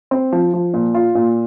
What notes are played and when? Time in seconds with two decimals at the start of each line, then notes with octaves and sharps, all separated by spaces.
0.11 C4
0.32 F3
0.54 F3
0.74 A#2
0.94 F4
1.15 A#2